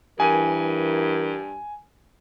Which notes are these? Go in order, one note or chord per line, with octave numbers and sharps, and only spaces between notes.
G2 E3 A#4 G#5 D#7